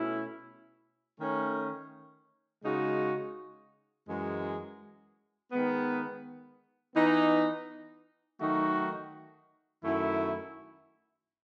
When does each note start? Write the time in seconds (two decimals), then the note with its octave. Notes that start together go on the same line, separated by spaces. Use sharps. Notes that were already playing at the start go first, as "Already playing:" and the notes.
Already playing: B2 A3 C#4 E4
1.19 D#3 A3 C#4
2.63 C#3 G#3 D#4 F#4
4.08 F#2 E3 G#3
5.52 D#3 G#3 B3
6.96 E3 B3 D#4
8.39 D#3 F#3 A3 D#4 F#4
9.83 F#2 D#3 A3 E4